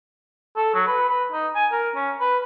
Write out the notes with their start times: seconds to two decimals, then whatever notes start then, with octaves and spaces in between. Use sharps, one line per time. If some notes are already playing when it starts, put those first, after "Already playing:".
0.57 A4
0.74 F#3
0.87 B4
1.08 B4
1.32 D#4
1.55 G#5
1.72 A#4
1.95 C#4
2.20 B4